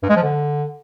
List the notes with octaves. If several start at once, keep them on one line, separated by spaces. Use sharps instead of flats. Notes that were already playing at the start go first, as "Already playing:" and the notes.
G2
G#3
F3
D3